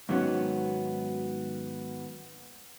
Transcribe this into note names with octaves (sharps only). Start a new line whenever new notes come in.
G#2 D#3 F#3 A#3 B3 C#4